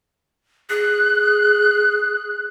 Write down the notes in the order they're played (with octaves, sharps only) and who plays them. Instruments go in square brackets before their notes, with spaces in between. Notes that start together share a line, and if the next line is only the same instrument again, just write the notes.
[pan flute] G#4 [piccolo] F#6